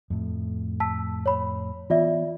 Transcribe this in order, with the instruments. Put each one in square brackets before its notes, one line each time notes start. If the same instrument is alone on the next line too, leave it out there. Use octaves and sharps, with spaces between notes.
[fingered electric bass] F2 A2
[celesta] A5 E6 B6
C#5 B5
[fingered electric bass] E3 B3 [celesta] F4 D5 E5